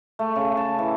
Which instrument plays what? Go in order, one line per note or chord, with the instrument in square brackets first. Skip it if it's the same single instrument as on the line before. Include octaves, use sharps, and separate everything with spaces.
[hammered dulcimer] A3
C#3
A5
E3